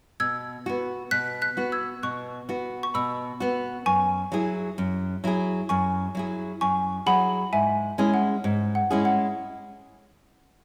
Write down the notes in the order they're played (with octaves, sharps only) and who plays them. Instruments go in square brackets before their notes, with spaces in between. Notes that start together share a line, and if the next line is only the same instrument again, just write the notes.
[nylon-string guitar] B2 [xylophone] E6 G#6
[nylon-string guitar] B3 F#4
[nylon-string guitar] B2 [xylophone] F#6 B6
[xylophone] F#6 B6
[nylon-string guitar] B3 F#4
[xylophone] E6 G#6
[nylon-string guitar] B2 [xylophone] C#6 F#6
[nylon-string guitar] B3 F#4
[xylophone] C#6
[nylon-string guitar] B2 [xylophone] B5 E6
[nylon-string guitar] B3 F#4
[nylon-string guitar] F#2 [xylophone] G#5 C#6
[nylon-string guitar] F#3 E4 G#4
F#2
F#3 E4 G#4
[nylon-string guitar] F#2 [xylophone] G#5 C#6
[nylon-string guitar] F#3 E4 G#4
[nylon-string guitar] F#2 [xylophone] G#5 C#6
[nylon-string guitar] F#3 E4 G#4 [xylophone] F#5 B5
[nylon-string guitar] G#2 [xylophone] E5 G#5
[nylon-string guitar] G#3 C#4 E4 G#4
[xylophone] F#5
[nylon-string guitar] G#2
[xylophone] F#5
[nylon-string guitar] G#3 C#4 E4 G#4
[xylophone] F#5